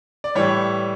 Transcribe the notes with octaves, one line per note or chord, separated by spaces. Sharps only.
D5
A2 E3 G3 C#5